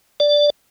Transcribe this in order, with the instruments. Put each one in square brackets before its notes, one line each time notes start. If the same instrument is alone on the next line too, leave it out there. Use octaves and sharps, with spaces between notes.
[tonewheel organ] D5